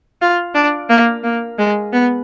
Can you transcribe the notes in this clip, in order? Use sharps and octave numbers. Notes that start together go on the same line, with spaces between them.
F4
D4
A#3
A#3
G#3
B3